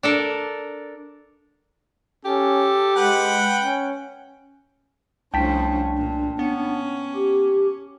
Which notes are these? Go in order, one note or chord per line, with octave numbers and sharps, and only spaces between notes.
D4 A4 A#4
C#4 G4 A4
G#3 B4 F#5 G5
C#4
C2 F3 A3 C#4 D4 G5 A5 B6
A#2
B3 C#4
G4